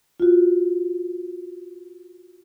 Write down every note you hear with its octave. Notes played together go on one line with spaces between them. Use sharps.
F4 F#4